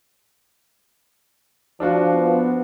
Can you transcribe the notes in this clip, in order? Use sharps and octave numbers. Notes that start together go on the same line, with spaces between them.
F3 D4 F4 F#4
B3